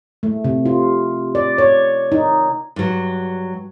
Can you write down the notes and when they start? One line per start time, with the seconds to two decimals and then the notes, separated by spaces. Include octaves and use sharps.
0.23 A3
0.44 C3
0.66 F4
1.35 D5
1.58 C#5
2.12 D#4
2.76 G2 F#3